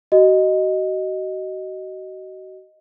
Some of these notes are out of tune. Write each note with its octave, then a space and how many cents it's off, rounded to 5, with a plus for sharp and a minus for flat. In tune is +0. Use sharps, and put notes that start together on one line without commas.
F#4 +35 D#5 +0